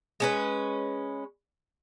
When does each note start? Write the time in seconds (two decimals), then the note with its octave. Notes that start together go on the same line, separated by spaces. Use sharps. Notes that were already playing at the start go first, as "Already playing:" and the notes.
0.20 G#3 C#4 B4